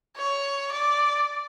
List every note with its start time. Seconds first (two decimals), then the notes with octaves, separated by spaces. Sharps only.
0.17 C#5
0.72 D5